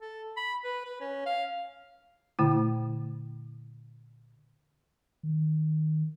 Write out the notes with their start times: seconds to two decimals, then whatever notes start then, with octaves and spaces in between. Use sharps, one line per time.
0.01 A4
0.37 B5
0.64 B4
0.85 B4
1.00 C#4
1.26 F5
2.39 A#2 D3 A3 E4
5.23 D#3